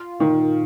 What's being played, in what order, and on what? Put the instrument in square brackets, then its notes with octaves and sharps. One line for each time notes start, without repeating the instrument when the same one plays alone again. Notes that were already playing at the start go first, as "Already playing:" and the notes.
Already playing: [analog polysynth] F4
[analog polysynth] A#2 [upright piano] D#3